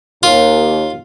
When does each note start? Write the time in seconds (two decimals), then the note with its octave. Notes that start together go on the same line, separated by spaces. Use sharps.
0.23 D#2 F4